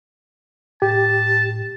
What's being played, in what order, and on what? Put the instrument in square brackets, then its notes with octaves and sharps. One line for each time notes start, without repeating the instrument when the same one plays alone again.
[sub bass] A2 [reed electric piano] G4 [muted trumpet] A5